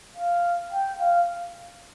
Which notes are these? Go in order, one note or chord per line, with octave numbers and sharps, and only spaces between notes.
F5
G5
F5